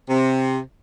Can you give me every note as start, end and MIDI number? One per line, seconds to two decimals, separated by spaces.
0.09 0.59 48